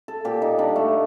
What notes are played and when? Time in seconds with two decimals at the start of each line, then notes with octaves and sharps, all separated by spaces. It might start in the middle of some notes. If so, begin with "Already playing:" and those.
0.08 A4
0.25 A#2 G4
0.42 D#4
0.58 G3 D4
0.76 A3